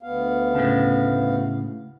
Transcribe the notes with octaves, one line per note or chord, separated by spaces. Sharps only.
D2 B3 F5
A2 C#3